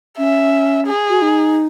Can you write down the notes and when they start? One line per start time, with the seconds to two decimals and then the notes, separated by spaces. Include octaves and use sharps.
0.18 C#4 E5
0.87 G#4
1.10 F#4
1.22 D#4